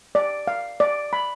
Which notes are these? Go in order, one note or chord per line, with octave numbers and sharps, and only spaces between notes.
D5
F5
D5
B5